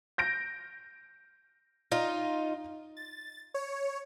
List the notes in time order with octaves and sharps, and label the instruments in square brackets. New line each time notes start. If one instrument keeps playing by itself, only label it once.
[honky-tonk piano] G6 A#6 D7
[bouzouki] D#4 F4
[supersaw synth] A6
C#5